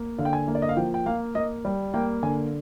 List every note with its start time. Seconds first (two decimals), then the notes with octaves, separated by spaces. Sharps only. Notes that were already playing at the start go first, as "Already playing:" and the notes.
Already playing: A#3
0.18 D3 F5
0.25 G5
0.33 G#5
0.48 A#3
0.55 D5
0.62 D#5
0.69 F5
0.77 F3 G5
0.94 G5
1.06 A#3 F5
1.35 A#3 D#5
1.65 G3
1.94 A#3 G5
2.23 D3 G#5